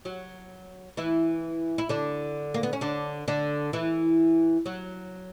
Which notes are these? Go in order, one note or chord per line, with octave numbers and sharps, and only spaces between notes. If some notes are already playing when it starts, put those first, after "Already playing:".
F#3 F#4
E3 E4
E4
D3 D4
A#3
B3
C#4
D3 D4
D3 D4
E3 E4
F#3 F#4